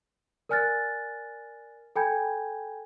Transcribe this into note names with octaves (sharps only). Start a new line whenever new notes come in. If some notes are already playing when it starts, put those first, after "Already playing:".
A#4 D5 G#5 F6 F#6 A6
A4 G5 G#5 B5 G6 G#6